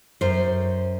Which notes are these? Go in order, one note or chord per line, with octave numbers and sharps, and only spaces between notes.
F#2 C5